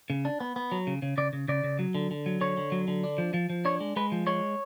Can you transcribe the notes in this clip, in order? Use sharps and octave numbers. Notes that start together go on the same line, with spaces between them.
C#3
D4
B3
B3
F#3
C#3
C#3
C#3 D5
C#3
C#3 D5
C#3
F#3
D3
D3
F#3
D3 C#5
D3
F#3
D3
D4
F3
F3
F3
D4 C#5
G#3
G#3 B4
F3
G#3 C#5